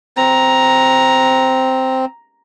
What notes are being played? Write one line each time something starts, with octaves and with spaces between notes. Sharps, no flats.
C4 A#5